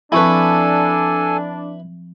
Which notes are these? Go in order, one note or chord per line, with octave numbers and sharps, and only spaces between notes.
F3 C4 D4 E4 A4 B4 G#5 C#6